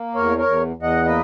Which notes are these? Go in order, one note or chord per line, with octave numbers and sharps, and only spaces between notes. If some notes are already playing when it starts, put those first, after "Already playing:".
Already playing: A#3
E2 A#4 C#5
A#4 C#5
E2
E2
D#5 F#5
A#3 B4 D#5